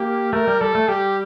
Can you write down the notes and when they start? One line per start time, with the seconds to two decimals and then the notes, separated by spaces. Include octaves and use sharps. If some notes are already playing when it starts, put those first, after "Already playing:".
Already playing: A#3 G4
0.33 A3 A#4
0.47 G3
0.61 G3 A4
0.75 A3
0.88 G3 G4